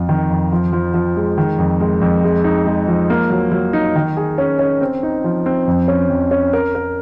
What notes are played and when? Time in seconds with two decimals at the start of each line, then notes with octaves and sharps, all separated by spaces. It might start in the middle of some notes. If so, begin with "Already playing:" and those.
Already playing: F2 F4
0.09 D#3
0.30 F2
0.52 F3
0.72 F3
0.94 F3
1.17 G#3
1.38 D#3
1.58 F2
1.80 G#3
2.01 F2
2.24 G#3
2.44 D#4
2.66 G#3
2.88 F3
3.10 A#3
3.30 F#3
3.52 F#3
3.73 D#4
3.95 D#3
4.17 G#4
4.38 C#4
4.59 C#4
4.81 C4
5.03 D#4
5.24 F3
5.46 C4
5.67 F2
5.88 C#4
6.09 F2
6.31 C#4
6.53 A#4
6.75 A#4